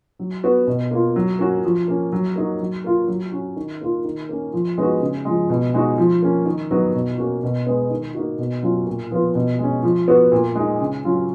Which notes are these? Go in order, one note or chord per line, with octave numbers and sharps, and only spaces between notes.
F#3
B3 F#4
B2
A#3 F4
F#3
A#3 C#4 F#4
F3
A#3 C#4
F#3
A#3 D#4 F#4
F#3
A#3 F4
F#3
C#4 F#4
D#3
A#3 F4
D#3
A#3 C#4
F3
G#3 B3 D#4 F#4
C#3
F3 G#3
B2
G#3 D#4 F#4
F3
A#3 C#4
D#3
F#3 B3 D#4 F#4
B2
A#3 C#4 F#4
B2
G#3 B3
D#3
A#3 D#4 F#4
B2
F#3 C#4 F4
A#2
F3 B3 F4
B2
G#3 C#4
F3
B3 F#4
A#2
G#3 D#4
C#3
F#3 C#4 F4